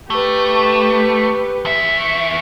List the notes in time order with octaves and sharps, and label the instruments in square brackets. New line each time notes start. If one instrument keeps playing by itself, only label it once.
[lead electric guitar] A3 [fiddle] G4 B4
[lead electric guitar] E2 E5
[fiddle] C#6